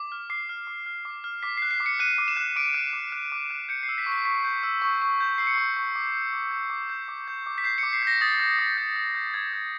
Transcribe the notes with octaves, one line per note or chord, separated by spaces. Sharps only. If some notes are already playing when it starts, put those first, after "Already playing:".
Already playing: D6
F6
D6 C7
F6
D6
F6
D6
F6
D6 B6
C7
F#6
C7
D6
C#7
F#6 D#7
D6
E7
F#6
D6 D7
F#6
D6
F#6
D6
F#6
G6 C#7
C7
E6
B6
C#6
B6
C#6 B6
G6
E6
C#6
C#6
G6
E6 C7
C#7
C#6 C7
C#6
D6
G6
D6
G6
D6
G6
D6
G6
D6
B6
G6 C7
C#7
D6
C7
G6 A#6
D#6 A6
G6
D#6
G6
D#6
G6
D#6 G#6
G6